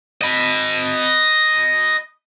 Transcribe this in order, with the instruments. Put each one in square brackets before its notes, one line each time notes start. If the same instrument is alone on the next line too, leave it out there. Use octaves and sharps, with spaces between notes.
[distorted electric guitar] D#5 B5